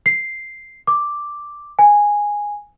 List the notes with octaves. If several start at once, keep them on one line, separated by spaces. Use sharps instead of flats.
C7
D6
G#5